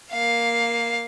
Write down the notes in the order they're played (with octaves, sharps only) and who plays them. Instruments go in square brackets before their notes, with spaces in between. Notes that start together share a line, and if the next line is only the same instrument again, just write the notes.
[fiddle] A#3 F5